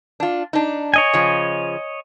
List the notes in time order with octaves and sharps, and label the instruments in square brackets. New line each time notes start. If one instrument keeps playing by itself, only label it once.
[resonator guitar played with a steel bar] D4 F4
D4 D#4
[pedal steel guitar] C#5 D#5 G#5
[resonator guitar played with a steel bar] C#3 F3